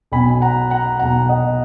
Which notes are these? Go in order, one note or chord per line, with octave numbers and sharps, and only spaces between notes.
B1 B2 G#5 B5
F#5 A#5
F#5 A#5
B1 B2 F#5 A#5
D#5 F#5